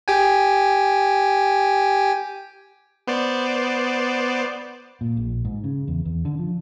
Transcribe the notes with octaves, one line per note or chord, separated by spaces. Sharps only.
G4 G5 G#5
B3 C5 D5
A#2
A#1
G#2
C#3
E2
E2
D3
F3